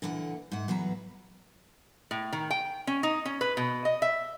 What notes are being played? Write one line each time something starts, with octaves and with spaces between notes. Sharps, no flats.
A#2 D3 E3 A#3 F#5
G#2 F#5
E2 F#3 B4 A#5
A2
D#3
G5
C#4
D#4
C#4
B4
B2
D#5
E5